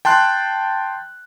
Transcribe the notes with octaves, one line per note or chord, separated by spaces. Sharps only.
G5 A5 C6 F#6